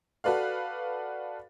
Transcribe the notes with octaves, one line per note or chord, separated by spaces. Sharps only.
F#4 A4 B4 D5 F5